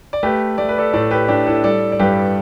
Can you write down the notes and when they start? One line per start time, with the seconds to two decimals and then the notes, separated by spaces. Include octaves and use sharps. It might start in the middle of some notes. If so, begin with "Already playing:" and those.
0.13 D5
0.23 A3 G4 B4
0.58 A3 D5
0.69 B4
0.78 A4 D5
0.93 A2 A4 D5
1.11 G4 B4
1.28 A2 D4 G4
1.46 E4 A4
1.64 G3 A4 D5
1.92 D5
2.00 G2 G4 B4